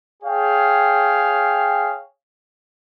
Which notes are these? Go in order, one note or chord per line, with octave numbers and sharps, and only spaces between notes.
G#4 C#5 F5 G5